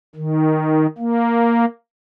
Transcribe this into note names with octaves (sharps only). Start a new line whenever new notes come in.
D#3
A#3